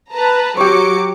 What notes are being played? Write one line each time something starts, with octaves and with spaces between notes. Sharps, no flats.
B4 A5 A#5
F#3 G4 C#5 D6 C#7